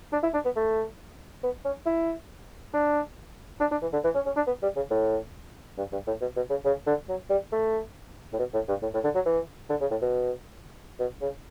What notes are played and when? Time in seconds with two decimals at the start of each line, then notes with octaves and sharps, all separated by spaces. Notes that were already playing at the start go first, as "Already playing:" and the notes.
0.12 D4
0.23 E4
0.34 D4
0.45 B3
0.56 A3
1.43 B3
1.65 C#4
1.86 E4
2.74 D4
3.60 D4
3.71 D4
3.82 E3
3.93 D3
4.04 E3
4.15 C#4
4.26 C#4
4.36 D4
4.47 B3
4.62 G3
4.76 C#3
4.90 A2
5.78 G2
5.92 G2
6.07 A2
6.21 B2
6.36 B2
6.50 C#3
6.65 C#3
6.87 D3
7.09 F#3
7.30 G3
7.52 A3
8.33 A2
8.39 B2
8.54 A2
8.68 G2
8.82 A2
8.94 A2
9.04 D3
9.15 F#3
9.26 E3
9.70 D3
9.80 C#3
9.91 A2
10.02 B2
10.99 B2
11.21 C#3